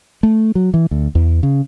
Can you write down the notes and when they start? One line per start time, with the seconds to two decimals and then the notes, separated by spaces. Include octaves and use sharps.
0.23 A3
0.55 F#3
0.74 E3
0.91 D2
1.15 E2
1.43 C#3